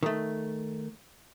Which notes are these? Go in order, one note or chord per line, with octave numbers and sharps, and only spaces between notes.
D#3 A3